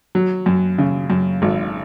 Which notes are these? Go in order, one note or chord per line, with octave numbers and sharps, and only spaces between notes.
F#3
F#2
C#3
F#2
G#1